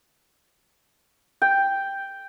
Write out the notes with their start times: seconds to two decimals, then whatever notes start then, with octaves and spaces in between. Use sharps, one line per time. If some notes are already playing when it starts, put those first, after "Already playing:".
1.42 G5